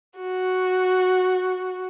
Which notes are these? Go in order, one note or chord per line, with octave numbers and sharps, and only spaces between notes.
F#4